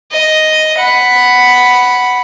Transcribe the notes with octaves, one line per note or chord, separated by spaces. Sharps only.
D#5
F#5 B5